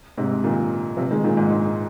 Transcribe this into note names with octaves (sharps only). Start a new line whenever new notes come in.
G#2 C3
A#2 D#3
C3 F3
D#3 G#3
A#2 D#3
G#2
G#2